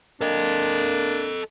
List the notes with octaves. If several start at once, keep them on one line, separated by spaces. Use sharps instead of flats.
A#3 D4 A4 D#5